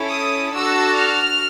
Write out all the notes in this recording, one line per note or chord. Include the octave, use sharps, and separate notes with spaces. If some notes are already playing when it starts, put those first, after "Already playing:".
Already playing: C#4 E4 A4
D#6
D4 F#4 A4 E6
F6